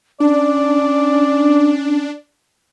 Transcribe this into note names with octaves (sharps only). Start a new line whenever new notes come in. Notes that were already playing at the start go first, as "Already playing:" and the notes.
C#4 D4 D5